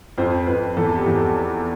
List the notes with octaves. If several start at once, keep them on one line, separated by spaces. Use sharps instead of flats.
F2 C5
F2 B4
E2 A4
G4
E2
A4